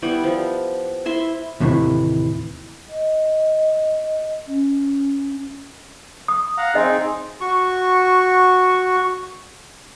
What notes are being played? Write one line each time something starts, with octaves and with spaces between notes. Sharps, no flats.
G3 B3 E4 G4
F3
E4 E5 C6
D#2 A2 C3 E3
D#5
C#4
D#6
F5 F#5 A#5
C4 D#4 G#4 D#5
F#4 C#6